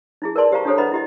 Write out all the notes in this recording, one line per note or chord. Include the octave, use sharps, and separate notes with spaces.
D#4 E4 G#4
A#4 B4 D5 A5 C6
G4 C5 F5 A5 A#5 C#6
D4 D#4 G4 A4 C5 C#5
B4 C5 D#5 F#5 A#5 B5
E4 G4 D#5